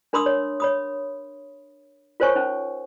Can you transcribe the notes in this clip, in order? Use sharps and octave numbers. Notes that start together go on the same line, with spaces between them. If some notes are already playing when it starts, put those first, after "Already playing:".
D4 A#4 B5 C6 D#6 E6
C#5
C#5 B5 D#6
F4 A#4 C5 C#5 G#5 C#6
C#4 D#4